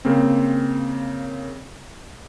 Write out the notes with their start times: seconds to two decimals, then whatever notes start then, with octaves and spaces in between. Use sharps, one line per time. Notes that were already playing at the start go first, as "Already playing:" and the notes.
0.05 C#3 A#3 C4